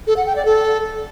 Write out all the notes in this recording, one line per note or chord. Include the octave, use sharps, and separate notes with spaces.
A4
F#5
G5
D5
A4